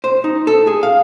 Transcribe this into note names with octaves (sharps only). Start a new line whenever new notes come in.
C5
D#4
A4
G#4
F5